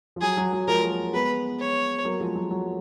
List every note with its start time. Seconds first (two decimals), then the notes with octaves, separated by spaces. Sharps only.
0.16 F3
0.21 F#3 G#4
0.37 F#3
0.53 F#3
0.67 F3 G#3 A#4
0.82 F#3 A#3
1.13 G#3 B3 B4
1.60 C#5
2.05 F#3 A#3
2.20 F3 G#3
2.36 F#3
2.51 F#3